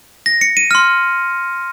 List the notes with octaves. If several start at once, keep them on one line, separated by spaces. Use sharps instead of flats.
A#6
C#7
D#7
C6 F6